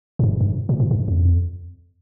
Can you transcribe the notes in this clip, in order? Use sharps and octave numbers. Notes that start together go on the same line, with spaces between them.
G#2
G2
G2
A#2
G#2
G2
F2